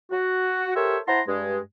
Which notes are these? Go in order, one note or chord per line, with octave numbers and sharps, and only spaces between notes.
F#4
G4 A4 A#4 C5 C#5 E5
E4 C5 F#5 A5 A#5 C6
G2 G#3